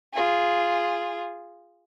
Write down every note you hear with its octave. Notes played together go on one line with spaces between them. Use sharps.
F4 G#4